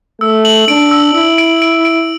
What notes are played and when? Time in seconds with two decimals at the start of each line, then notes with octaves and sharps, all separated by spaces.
0.21 A3 E6
0.45 F#7
0.68 D4 D7
0.91 E6
1.15 E4 E6
1.38 D7
1.62 D7
1.85 D7